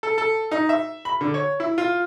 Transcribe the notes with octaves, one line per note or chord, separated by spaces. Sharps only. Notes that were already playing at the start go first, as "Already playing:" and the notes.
A4
A4
D#4
E5
B5
D3
C#5
E4
F4